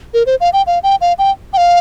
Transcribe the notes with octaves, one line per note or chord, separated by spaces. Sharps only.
A#4
C5
F5
G5
F5
G5
F5
G5
G5
F5